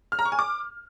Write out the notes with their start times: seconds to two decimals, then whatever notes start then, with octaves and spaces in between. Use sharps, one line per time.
0.12 F6
0.19 A#5
0.25 C#6
0.32 G#5
0.39 D6